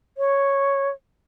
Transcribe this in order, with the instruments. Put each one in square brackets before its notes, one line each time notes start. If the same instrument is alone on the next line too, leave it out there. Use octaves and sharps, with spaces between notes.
[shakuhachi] C#5